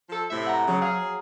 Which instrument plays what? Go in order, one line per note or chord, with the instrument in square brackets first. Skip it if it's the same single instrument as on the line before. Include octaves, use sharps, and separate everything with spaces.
[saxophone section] F3 A4
A2 C3 E5
[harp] F#5 A#5
[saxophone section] C#3 [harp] F#3
[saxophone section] G#4 [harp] F5